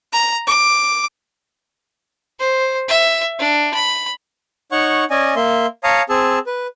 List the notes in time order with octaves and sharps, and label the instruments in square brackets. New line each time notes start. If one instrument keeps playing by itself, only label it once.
[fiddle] A#5
D6
C5
E5
D4
B5
[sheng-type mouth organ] D#4 C#5 F#5 C#6
C#4 D5 D#5 G#5
A#3 E5 C6
C#5 F5 A5 A#5 D#6
C4 G#4 A5 E6
B4